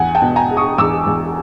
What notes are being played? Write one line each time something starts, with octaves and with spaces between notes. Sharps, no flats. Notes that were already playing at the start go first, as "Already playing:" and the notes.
Already playing: E2 F#5 G#5
G5 A5
B2
G#5 A#5
G#3
C#6 D#6
E2 D6 E6
E2